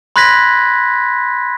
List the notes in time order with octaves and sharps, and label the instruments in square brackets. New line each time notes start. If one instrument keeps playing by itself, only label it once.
[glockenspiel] B5 C6 F#6 G#6 A#6 B6